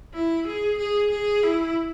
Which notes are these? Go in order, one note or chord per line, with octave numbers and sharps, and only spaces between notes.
E4
G#4
G#4
G#4
E4